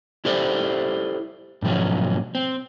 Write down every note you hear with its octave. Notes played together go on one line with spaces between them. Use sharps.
E4 G4 A4 C5 D5 E5
G#2 B2 F3 F#3 C#4
C4